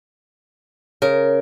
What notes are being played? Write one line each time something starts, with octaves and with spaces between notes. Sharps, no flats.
C#3 A#4